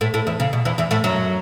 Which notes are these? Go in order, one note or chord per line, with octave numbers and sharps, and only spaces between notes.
A2 A3
A2 A3
E2 E3
C#3
B2
E2 E3
E2 E3
A2 A3
F#2 F#3